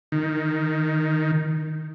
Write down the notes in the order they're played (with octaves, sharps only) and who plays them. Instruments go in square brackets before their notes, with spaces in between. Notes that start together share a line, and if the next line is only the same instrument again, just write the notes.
[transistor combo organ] D#3